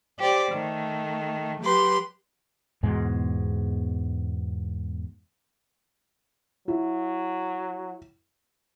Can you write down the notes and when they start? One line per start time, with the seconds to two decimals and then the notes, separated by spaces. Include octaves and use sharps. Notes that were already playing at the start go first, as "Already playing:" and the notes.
0.19 G4 C5 D5
0.51 D#3 A3
1.62 F#3 G4 B4 C6
2.83 E2 G#2 B2 G#3
6.68 F#3 E4